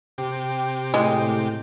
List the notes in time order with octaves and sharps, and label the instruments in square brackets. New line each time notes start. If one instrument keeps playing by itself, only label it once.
[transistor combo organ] C3 G4
[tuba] A2 [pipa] G#3